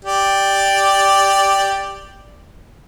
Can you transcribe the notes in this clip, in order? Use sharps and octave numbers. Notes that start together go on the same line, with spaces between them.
G4 D5